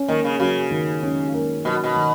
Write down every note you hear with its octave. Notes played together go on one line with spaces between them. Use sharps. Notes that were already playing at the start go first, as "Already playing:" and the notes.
Already playing: C#4
D#3 A#3
C#3
C#3 F#3
D#3
C#4
A#3
B2 F#3
B2
D#3